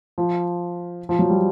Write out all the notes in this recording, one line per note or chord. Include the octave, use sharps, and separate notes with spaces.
F3
F3
F#3
G3